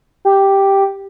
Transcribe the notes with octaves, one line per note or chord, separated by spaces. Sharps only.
G4